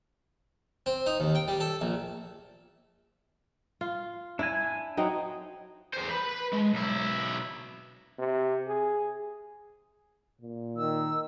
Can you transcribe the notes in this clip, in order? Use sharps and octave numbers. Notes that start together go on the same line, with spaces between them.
C4
D#4
D#2
G5
G3
A4
A#1
F4
D4 E4 G#5
F#3 C4 D#4
E2 C5
B4 B5
G#3
B1 E4
C3
G#4
A#2
D#3 E6